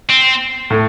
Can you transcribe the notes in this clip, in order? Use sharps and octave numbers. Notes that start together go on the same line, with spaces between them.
C4
A2